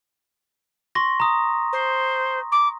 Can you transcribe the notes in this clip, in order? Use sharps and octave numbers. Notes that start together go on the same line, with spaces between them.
C6 C#6 A#6
A#5 D#6
C5
D6